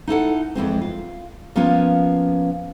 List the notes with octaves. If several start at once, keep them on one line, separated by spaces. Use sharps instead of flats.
D#4 E4 A4 F#5
F2 E3 G#3 C4
F4
F3 A#3 B3 C#4 F4